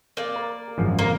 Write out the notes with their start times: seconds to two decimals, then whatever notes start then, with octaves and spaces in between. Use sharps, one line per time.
0.17 A#3 D5
0.36 A#4
0.78 G#1 F#2 F3
0.99 A#3